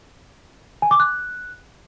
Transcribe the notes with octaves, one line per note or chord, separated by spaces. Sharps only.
G#5
D6
F#6